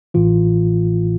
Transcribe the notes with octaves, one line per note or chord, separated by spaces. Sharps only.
A1 A2 E3 F4